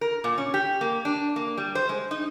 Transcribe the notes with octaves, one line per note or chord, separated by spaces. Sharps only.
A#4
A#2
C#4
G4
A#3
D4
A#3
G3
C5
G#3
D#4